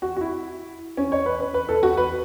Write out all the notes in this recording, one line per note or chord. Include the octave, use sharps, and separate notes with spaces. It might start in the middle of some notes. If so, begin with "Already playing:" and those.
F#4
F#4
E4
C#4
C#5
B4
B4
B4
A4
F#4
B4